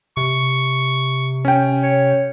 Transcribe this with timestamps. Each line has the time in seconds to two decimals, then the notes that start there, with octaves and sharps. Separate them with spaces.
0.17 C3 C#6
1.45 C#4 G5
1.82 C#5